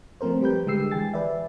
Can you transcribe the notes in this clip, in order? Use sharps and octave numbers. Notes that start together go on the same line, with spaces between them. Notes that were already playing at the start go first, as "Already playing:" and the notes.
F3 A3 C4 A#4 C5
G3 G4 B4 G6
D3 G#3 G4 E6 C7
E3 G5 G#5 A6
B4 D5 E5